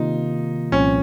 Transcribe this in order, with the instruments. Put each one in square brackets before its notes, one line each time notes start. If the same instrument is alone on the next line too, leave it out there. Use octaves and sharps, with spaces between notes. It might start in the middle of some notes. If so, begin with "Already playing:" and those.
Already playing: [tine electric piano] C3 D#3 A#3 F4 [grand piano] D#4
[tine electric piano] C2 A#2 F3 C4 [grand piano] C#4